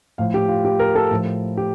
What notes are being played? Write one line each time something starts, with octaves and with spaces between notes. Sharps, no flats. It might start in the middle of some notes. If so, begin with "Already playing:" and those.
A2 F3 F5
G4
F4
G4
A#4
A4
A2 F3
G4